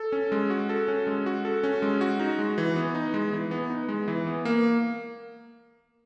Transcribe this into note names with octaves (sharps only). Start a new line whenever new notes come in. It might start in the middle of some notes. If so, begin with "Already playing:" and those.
Already playing: A4
C#4
G#3
F#4
A4
C#4
G#3
F#4
A4
C#4
G#3
F#4
D#4
G#3
E3
B3
D#4
G#3
E3
B3
D#4
G#3
E3
B3
A#3